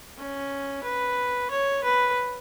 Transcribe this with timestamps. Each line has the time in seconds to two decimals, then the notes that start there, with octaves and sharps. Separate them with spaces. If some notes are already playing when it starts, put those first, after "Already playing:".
0.17 C#4
0.83 B4
1.50 C#5
1.83 B4